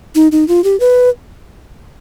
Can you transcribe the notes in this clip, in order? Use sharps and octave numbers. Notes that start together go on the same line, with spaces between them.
D#4
D#4
F4
G4
B4